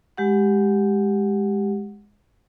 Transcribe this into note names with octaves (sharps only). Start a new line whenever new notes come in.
G#3 G4 F#5